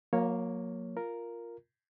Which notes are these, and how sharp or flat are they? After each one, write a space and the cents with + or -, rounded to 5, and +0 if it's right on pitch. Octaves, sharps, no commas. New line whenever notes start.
F#3 -40 A#3 +0 C#5 +0
F4 +0 A#4 +0